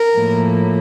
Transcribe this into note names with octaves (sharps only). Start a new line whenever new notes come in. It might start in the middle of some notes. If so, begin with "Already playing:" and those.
Already playing: A#4
A2 F3 A#3